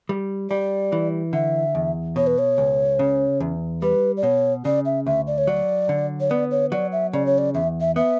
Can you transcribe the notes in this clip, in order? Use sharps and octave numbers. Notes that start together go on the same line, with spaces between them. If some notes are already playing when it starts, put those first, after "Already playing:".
G3
G3 D5
E3
D3 E5
E2
B2 C#5
B4
C#5
C#2
C#3
E2
G3 B4
D5
B2 C#5
C#3 D5
E5
D2 E5
D5
C#5
F#3 D5
D3
C#5
B3 D5
C#5
F#3 D5
E5
C#3 D5
C#5
D5
E2 E5
E5
B3 E5